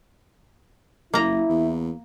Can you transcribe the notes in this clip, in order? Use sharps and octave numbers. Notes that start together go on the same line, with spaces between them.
F#1 A#3 E4 A#5
E2